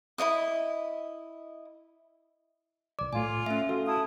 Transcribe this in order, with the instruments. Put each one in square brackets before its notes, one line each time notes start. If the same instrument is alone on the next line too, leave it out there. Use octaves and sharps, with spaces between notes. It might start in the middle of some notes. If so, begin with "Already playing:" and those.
[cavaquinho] E4 C#5 D#5 D#6
[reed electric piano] C2 D6 [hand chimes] D5
[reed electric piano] A2 A3 [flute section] F4 F5 [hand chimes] G#5
[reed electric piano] A3 [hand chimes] C#4 E5
[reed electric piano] F#4 E5 F5 [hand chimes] A4
[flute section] E4 A5 D#6